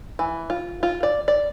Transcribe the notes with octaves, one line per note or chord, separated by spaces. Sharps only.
E3
F4
F4
D5
D5